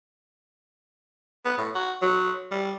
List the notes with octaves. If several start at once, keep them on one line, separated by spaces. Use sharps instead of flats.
B3
A2
F#4
F#3
G3